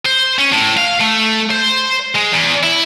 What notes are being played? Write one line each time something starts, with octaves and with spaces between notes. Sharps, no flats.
C5
C#4
A2
F5
A3
C5
G#3
E2
E4